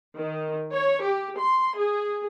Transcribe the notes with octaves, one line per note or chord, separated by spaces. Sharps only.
D#3
C#5
G4
C6
G#4